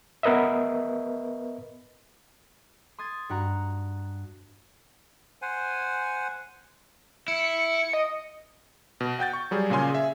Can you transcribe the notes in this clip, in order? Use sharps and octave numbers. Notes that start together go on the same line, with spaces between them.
B3 A#4 B4 D#5 E5
C6 D#6 G#6 A6
G2 F#4 F#5 A#5
C5 F#5 G#5
E4 C#7
D#5
B2
F#5 G5 G6 A6
C#6
F#3 G3 G#4
A#2 C#3 C#4 G#5 C6
G#4 E5